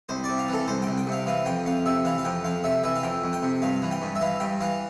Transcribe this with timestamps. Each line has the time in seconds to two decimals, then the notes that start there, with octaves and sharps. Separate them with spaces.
0.09 C2 C5
0.24 C3 D5
0.38 F5
0.49 E3 A4
0.68 C2 C5
0.82 C2 G5
0.98 G5
1.07 C3 F5
1.27 E3 F5
1.46 F2 G5
1.66 F2 F5
1.86 C3 E5
2.05 E3 F5
2.18 F5
2.25 F2 G5
2.44 F2 F5
2.64 C3 E5
2.84 E3 E5
2.96 F5
3.03 F2 G5
3.24 F2
3.33 G5
3.43 C3
3.62 G2 F5
3.82 E3
3.91 G5
4.02 G2
4.15 E5
4.21 E3 F5
4.40 G2 G5
4.61 E3 F5